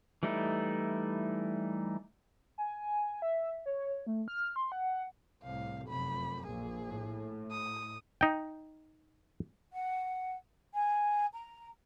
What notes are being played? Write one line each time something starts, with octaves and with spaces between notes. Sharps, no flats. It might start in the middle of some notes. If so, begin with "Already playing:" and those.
E3 G3 A3 D#4 E4
G#5
E5
C#5
A3
F6
C6
F#5
C2 A2 F5
F1 F#2 B5
A#1 G#4
A2
D#6
D#4 G5
F#5
G#5
A#5